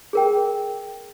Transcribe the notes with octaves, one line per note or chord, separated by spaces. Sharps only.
G#4 A#4 G5